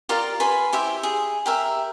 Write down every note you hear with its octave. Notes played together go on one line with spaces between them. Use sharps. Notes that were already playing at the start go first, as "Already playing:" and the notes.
F4 G4 A#4 D5
B4 G#5 B5 C6
E4 G4 C5 E5
G#4
G4 A#4 E5